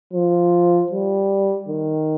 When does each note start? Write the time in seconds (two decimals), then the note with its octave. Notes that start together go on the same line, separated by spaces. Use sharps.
0.13 F3
0.91 G3
1.68 D#3